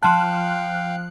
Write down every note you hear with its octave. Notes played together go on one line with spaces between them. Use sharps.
F3 F5 G5 A5 F#6